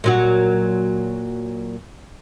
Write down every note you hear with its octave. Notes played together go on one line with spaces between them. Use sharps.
A#2 F#3 F#4